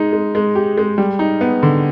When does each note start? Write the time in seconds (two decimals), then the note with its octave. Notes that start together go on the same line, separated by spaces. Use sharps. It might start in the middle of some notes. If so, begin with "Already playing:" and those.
Already playing: G#3 D#4
0.13 G#3
0.35 G#3
0.55 G4
0.78 G#3
0.98 G3
1.19 D#4
1.41 B3
1.63 D3